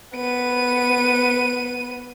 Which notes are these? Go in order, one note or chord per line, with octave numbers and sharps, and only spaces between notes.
B3 D#7